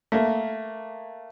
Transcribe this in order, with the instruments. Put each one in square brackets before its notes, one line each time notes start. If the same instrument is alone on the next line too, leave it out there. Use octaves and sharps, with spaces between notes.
[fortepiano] A3 A#3